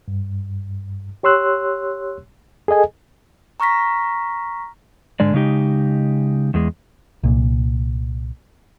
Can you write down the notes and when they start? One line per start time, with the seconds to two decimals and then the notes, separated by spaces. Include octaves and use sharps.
0.08 G2
1.23 G4 C#5 C6 E6 F#6
2.68 G#4 A4 D#5 G#5
3.60 A#5 C#6 F6 A#6 B6
5.20 G#2 D3 G#3 D5
5.34 C#3 G#3 D#4 G4
6.54 E2 G#3
7.23 C2 A#2